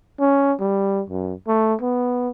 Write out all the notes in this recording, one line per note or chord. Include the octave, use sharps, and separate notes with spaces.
C#4
G3
F#2
A3
B3